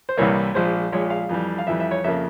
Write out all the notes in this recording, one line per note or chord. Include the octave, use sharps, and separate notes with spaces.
C5
C2 C3 E3 G3 A#3 C#5
A#1 A#2 G#3 C5
A#1 A#2 G#3 C#5
F5
F2 E3 G3
F5
F2 E3 G3 E5
E5
C#5
F2 C#3 F3 A#3 E5